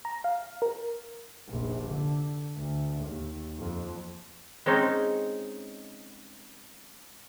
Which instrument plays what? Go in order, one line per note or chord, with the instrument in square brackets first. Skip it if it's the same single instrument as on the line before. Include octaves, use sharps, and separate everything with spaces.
[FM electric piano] A#5
F5
A#4
[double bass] F1 A#1
D3
D2
D#2
F2
[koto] G#3 C4 C#4 D#4